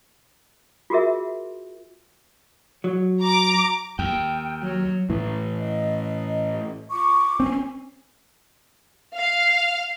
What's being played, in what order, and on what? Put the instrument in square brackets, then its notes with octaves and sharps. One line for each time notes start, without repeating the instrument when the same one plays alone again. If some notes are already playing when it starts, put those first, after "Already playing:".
[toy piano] F4 F#4 G#4 A#4 E5
[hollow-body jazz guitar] F#3
[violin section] A#5 D6
[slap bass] D#2 [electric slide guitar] G5
[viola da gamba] F#3
[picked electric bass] A2 E3
[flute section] D#5
F4 C#6 D6
[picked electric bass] C4 C#4 [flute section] G#5
[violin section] F5